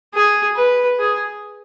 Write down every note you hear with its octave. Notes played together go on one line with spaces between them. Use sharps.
G#4
B4
G#4